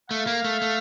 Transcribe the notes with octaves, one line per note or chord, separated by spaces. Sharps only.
A3 F5
A#3
A3
A3